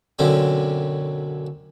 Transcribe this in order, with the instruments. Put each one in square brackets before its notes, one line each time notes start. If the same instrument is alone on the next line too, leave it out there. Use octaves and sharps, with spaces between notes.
[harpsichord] B1 F#2 D3 C4 C#4